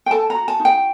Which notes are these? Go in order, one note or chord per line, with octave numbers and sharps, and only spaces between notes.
G5
A4 A5
A#5
F#4
A5
D#4
G5